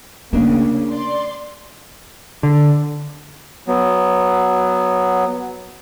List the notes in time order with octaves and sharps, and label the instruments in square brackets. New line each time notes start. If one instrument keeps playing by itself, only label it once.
[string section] C#3 [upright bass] A3 [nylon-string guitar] A#3 D4
[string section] D5 C6
[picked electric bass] D3
[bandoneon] F#3 B3